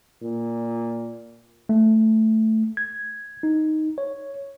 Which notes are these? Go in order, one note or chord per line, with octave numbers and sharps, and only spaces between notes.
A#2
A3
G#6
D#4
C#5